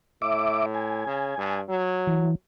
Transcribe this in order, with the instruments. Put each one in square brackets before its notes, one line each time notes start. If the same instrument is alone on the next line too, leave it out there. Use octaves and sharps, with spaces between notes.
[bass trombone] A2 [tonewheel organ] E5 D6
[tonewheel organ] G#5
[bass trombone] C#3
G2
F#3
[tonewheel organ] E3